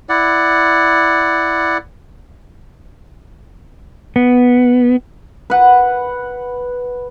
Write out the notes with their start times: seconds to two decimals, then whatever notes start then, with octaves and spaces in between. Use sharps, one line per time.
0.09 E4 D5 F#5
4.16 B3
5.50 B4 F#5